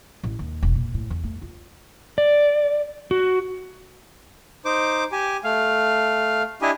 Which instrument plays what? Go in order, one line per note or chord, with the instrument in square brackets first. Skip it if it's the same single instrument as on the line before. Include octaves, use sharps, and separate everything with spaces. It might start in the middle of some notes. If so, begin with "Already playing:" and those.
[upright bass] A1
D#2
E1
A#2
A2
E2
A3
F4
[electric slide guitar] D5
F#4
[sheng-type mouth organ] D#4 C5 D6
G4 G#5
A3 F5
D4 E4 G4 D#5 G#5